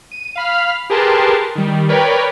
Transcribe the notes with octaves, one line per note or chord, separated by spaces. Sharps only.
D#7
F5 B5 F6
G4 G#4 A#4 B4 A5 C6
D#3 G3
A#4 B4 C#5 D5 G5 B5